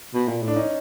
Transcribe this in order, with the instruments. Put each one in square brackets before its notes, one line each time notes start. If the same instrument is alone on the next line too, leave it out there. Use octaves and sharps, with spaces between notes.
[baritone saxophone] B2
A#2
A2
[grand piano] D4
C#4 D#4